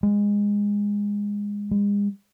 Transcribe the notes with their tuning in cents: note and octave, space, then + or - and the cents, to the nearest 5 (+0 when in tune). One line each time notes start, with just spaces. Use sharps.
G#3 -20
G#3 -40